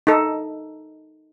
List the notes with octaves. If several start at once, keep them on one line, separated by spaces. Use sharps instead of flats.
D#4 A4